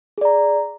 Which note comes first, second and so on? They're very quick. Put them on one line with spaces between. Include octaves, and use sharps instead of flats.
G#4 D5 A#5